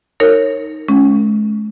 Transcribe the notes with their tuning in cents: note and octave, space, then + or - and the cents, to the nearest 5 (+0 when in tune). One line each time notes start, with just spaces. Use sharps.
D#4 +0 A#4 -25 C#5 -15
G#3 +40 C#4 +0